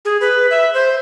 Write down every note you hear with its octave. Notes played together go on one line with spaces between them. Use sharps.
G#4
B4
E5
C5